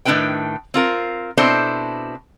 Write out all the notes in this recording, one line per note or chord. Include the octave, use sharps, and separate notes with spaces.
A2 D#3 D4 E4 B4 G5
C4 F4 A#4
B2 C4 D4 E4 A4 C5